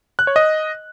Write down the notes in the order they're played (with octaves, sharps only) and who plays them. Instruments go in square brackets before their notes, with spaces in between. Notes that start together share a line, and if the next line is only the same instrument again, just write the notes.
[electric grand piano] F#6
C#5
D#5